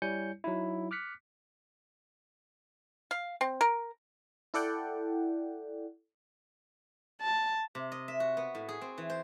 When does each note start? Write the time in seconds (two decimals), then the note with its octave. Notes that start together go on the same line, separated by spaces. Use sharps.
0.02 G3 E4 C#5 G#5 G6 C#7
0.44 F#3 D#4 E4
0.91 D6 F6 F#6 B6 C#7
3.11 F5
3.41 C4
3.61 A#4
4.54 E4 A4 D5 F#5 G5
7.21 A5
7.75 C3
7.92 D#5
8.08 E5
8.20 F#4
8.37 B3
8.55 A2
8.69 G#4
8.81 C4
8.98 E3
9.10 C5